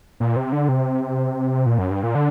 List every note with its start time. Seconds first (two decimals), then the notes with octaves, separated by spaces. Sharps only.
0.20 A#2
0.36 C3
0.52 D3
0.69 C3
1.66 A#2
1.78 F#2
1.91 G2
2.03 A#2
2.15 D3